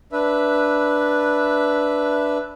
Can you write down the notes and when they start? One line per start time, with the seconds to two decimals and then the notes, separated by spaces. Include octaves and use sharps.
0.12 D4 B4 E5